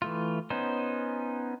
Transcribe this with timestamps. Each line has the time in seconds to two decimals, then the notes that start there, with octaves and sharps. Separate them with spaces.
0.02 E3 A3 F4
0.50 B3 C#4 D#4 C5